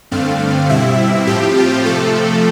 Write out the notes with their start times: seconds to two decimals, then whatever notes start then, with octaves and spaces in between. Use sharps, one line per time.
0.11 G2 D3 A3 C4 F5
0.69 B2 G3 C4 E4 E5
1.27 A2 F3 C4 G4
1.57 F4
1.85 C3 F3 A3 A4